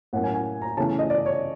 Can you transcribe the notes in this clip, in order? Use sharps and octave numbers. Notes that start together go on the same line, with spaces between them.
A2 F#3 A#3 C#4 F#5
G#5
G#5
A#5
C#3 E3 A3 C#4 A5
D#5
D5
C#5